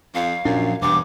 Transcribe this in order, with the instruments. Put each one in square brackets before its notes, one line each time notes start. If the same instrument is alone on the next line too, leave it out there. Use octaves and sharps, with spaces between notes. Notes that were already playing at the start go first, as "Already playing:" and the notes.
[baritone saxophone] F2 [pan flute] F5
[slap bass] A#1 F3 D4 [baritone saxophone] F#2
[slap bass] E1 [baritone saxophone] G2 [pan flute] D6